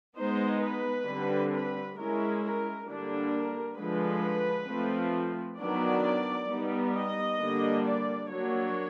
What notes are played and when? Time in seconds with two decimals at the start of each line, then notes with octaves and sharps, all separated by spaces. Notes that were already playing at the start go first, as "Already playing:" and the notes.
0.16 G#3 B3 D#4 C5
0.61 B4
1.06 D3 G3 C4
1.51 B4
1.96 G#3 C#4 E4 A#4
2.42 A#4
2.87 D3 G3 A#3 D4
3.33 A#4
3.77 D3 F3 G#3 B4
4.68 F3 A3 C4
5.58 D#3 F#3 B3 D4 D5
6.49 G3 B3 D#4
6.94 D#5
7.40 D3 G3 A#3 D4
7.85 D5
8.29 F#3 A#3 D4 C#5